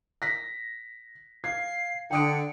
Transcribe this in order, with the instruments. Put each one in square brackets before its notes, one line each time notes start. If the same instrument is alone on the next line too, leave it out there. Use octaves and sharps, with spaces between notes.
[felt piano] A#6 B6
[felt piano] F5 G#6 [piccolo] C7
[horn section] D3 [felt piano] G5 D#6 D7 [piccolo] C#7